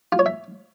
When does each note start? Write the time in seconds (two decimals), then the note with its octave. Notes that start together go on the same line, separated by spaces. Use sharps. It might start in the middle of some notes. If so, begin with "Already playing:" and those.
0.12 F4
0.19 C#5
0.26 E5